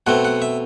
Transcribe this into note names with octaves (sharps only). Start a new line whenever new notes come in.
B2 A3 C4 F#5
F#5
E5